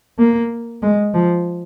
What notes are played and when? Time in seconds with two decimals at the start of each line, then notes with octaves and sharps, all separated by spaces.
0.19 A#3
0.83 G#3
1.14 F3